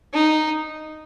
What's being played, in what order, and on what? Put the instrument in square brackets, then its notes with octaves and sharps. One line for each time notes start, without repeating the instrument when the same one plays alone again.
[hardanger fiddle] D#4